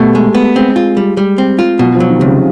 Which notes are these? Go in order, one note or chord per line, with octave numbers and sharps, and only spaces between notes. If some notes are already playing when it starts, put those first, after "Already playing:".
Already playing: B2 G3 A3
G#3
B3
G#3 C4
F4
G3
G3
C4
F4
B2 F#3
F3
F#3
D#3
C#2 C3
C#3